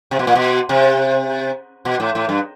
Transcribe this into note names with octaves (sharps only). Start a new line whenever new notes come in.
C3
B2
A#2
B2
C3
B2
A2
A2
G2